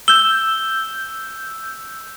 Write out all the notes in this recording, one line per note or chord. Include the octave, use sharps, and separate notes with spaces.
E6 G6 G7